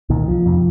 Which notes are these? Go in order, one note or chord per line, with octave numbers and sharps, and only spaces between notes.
C2 A#2 D#3
F3
F2 C3